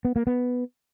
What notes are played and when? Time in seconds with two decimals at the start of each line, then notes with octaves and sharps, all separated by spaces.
0.05 B3
0.16 A#3
0.27 B3